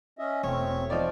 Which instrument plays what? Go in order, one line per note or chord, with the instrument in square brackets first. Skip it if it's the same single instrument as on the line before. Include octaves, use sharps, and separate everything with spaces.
[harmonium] C#4 D#5 E5
[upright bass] E1 [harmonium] A3 C4 [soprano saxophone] C#5
[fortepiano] F3 D#4 D5